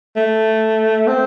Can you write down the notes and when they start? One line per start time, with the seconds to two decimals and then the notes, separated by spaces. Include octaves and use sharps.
0.16 A3
1.07 C4